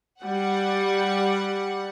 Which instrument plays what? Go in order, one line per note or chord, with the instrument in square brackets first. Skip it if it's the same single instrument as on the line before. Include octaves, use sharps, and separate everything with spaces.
[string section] G3 F#5